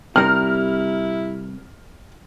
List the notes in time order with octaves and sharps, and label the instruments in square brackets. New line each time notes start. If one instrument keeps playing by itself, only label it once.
[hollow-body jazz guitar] C3 G3 A#4 [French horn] E4 [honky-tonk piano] F6